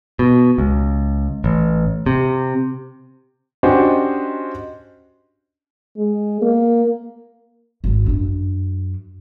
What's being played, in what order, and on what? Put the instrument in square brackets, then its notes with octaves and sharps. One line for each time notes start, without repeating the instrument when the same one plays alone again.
[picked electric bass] B2
C#2
A1
C3
[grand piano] C#4 D4 F#4 G4 C5 D#5
[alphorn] G#3
A#3
[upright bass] G#1 A2
F#2 D4